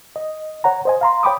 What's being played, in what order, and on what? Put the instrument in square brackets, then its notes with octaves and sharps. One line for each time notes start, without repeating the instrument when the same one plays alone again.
[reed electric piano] D#5
C#5 F#5 A#5
C5 D#5 G#5
F5 A#5 C6
C#5 G5 B5 D6 D#6